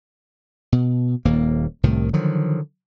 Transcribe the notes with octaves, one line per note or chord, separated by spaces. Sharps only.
B2
D#1 D#2 A#3
C2 A2 C3 D#3
D3 D#3 F3 F#3